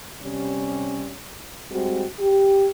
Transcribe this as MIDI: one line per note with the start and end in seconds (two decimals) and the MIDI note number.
0.23 1.12 48
0.23 1.12 55
0.23 1.12 61
0.23 1.12 73
1.71 2.05 55
1.71 2.05 56
1.71 2.05 60
1.71 2.05 66
2.20 2.68 67